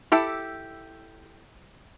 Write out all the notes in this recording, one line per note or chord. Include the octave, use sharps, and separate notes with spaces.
E4 G4 A4 E5